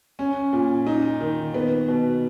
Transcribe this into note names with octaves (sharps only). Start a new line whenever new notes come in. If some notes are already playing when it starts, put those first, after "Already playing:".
C#4
A#2
D#4
D#3
B3
B2